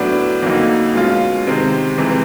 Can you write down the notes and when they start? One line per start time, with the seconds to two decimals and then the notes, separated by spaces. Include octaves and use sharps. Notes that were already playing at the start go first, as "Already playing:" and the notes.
Already playing: A2 F#3 B3 D4
0.42 F2 D3 F#3 A#3 D#4
0.94 B2 G#3 C#4 F4
1.47 C3 D#3 G#3 C4
1.98 F2 C3 E3 G#3